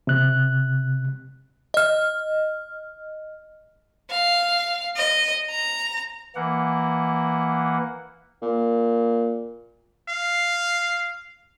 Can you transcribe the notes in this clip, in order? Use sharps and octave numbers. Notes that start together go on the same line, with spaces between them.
C3 F#6
D#5 F6
F5
D#5
A#5
E3 A#3 F#5
A#2
F5